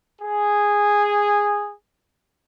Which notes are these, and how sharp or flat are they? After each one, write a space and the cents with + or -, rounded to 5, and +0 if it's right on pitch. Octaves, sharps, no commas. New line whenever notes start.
G#4 -10